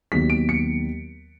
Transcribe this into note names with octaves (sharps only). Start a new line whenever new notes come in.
D#2 D#3 F#3 B3 B6
D7
C#7